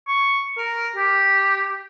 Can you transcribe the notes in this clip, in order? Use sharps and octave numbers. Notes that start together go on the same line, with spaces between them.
C#6
A#4
G4